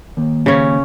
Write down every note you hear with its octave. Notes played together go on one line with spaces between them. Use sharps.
D#2
C#3 C#4